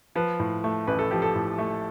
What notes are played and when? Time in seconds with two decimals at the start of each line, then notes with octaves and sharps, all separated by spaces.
0.16 F3 B4
0.40 A2
0.64 A3
0.87 A1 B4
0.99 A4
1.11 F3 G4
1.22 A4
1.35 A2
1.58 A3